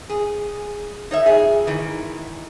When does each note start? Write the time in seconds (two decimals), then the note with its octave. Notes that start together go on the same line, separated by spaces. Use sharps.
0.09 G#4
1.11 D#4 C#5 E5
1.26 F2 G#4
1.67 G#2 D#3 E3